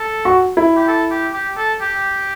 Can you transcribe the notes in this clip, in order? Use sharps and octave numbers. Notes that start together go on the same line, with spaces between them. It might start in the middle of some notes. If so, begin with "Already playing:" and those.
Already playing: A4
F#4
E4
G4
A4
G4
G4
A4
G4